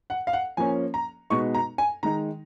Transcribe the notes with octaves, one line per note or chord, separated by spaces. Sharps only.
F#5
F5
F#5
F3 A#3 C#4 G#5
A#5
B2 G#3 B3 D#4 C#6
A#5
G#5
D#3 G#3 D#4 A#5